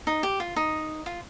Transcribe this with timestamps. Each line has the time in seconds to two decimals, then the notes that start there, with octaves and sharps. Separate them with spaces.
0.07 D#4
0.23 G4
0.40 F4
0.56 D#4
1.06 F4